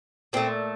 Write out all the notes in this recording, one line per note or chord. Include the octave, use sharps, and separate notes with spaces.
A#2 A3 C4